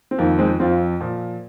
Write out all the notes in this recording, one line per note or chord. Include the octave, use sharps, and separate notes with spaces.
C4
F2 D#3 A#3
G#3 C4
F2 F3 C4 F4
A#2 F3